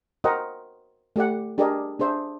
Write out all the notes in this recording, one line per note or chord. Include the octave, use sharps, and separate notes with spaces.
F#4 A#4 C5 D#5 F#5 G5
A3 G4 D5 F#5
D4 G4 G#4 A#4 D5 D#5
D4 G#4 C5 E5